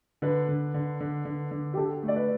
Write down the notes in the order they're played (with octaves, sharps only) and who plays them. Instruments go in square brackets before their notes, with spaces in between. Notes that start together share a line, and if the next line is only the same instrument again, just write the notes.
[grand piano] D3 [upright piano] B4
[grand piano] D3
D3
D3
D3
D3
[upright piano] G4
[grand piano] D3 [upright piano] A4
[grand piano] A3
[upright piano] D5
B4